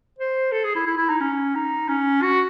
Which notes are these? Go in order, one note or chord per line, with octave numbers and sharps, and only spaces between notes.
C5
A4
G#4
E4
E4
E4
D#4
C#4
D#4
C#4
F#4